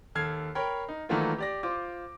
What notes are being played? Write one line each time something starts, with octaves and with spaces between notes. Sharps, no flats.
D#2 A4 F6 G#6 C7
A#4 C#5 G5 B5
D#4
D#3 E3 F#3 A3 A#3 F4
G4 D5 A#6
F4 C5 D6